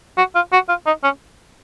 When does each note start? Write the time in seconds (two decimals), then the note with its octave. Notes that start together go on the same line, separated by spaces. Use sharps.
0.18 F#4
0.35 F4
0.53 F#4
0.69 F4
0.86 D#4
1.04 C#4